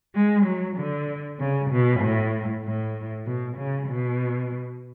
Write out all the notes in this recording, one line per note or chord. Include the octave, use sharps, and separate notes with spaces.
G#3
F#3
D3
C#3
B2
A2
A2
B2
C#3
B2